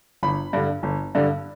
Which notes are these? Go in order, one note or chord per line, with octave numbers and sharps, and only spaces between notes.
G1 B5
G2 D3
G1
G2 D3